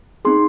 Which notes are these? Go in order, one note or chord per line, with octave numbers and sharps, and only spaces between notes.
C4 D#4 G#4 C6